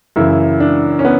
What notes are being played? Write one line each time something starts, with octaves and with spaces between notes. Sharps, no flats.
F#2 C#3 E3 E4
D4
C#4
B3